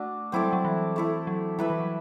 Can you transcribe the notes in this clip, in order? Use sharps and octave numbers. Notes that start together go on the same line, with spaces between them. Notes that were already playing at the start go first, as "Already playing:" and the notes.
Already playing: A3 D4 F#4
F#3 C4 E4 A4 D5
G3
F#3
E3
A3 E4 A4
F#3
G3 E4 B4 E5
E3
F#3